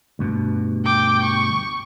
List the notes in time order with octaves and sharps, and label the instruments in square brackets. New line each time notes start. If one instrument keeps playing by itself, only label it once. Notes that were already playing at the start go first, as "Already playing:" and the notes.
[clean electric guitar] D2 G2 B2
[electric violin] G5 D6
C#6